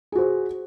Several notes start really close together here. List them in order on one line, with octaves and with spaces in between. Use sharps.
G#4 F#4 C5